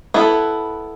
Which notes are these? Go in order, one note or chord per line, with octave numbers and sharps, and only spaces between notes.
B3 E4 A4